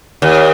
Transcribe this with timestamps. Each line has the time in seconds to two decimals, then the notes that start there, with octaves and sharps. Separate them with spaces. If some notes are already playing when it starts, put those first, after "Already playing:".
0.22 D#2